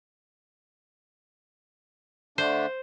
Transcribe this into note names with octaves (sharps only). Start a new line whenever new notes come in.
D3 A3 D4 C5